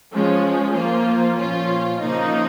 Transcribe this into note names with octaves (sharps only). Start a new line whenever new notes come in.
F3 G#3 C#4
F3 A#3 F4
A#2 F3 C#4 F4
C#3 F3 A#3 D#4